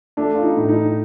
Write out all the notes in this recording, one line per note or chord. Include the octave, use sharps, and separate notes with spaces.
A3 D4
F4
D#4
A2
D4
D#4